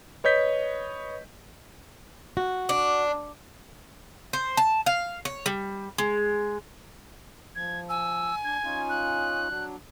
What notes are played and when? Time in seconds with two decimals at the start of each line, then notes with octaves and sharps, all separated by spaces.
0.24 B4 C#5 D#5 G6 B6
2.37 F#4
2.69 D4
4.33 C5
4.57 A5
4.86 F5
5.25 C#5
5.46 G3
5.98 G#3
7.55 F3 G#6
7.89 G#5 E6
8.44 D4 G#6
8.64 C#4 D#4 F4
8.90 F#6
9.49 F#3 D4